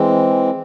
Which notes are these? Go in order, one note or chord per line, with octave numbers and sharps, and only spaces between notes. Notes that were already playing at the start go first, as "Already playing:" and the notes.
Already playing: E3 G#3 C4